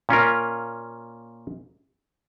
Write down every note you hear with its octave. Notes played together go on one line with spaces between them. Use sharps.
A#2 C#4 F4 A#4